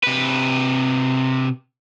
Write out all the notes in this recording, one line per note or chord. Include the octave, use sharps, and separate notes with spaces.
C3 B4